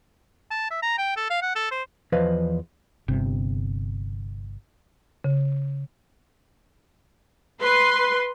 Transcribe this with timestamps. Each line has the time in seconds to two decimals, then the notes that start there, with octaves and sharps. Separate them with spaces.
0.51 A5
0.71 E5
0.83 A#5
0.98 G5
1.17 A4
1.31 F5
1.42 F#5
1.56 A4
1.72 C5
2.12 E2 F3 B4 C5 D#5 F5
3.08 G1 C3
5.24 C#3
7.61 B4 C6